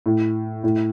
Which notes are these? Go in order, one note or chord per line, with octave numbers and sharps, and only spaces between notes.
A2
A2